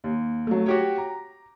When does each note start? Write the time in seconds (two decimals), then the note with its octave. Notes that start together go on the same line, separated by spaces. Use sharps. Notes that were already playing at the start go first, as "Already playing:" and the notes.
0.04 D#2
0.47 F#3 A3
0.66 F#4 G4 C#5
0.98 A#5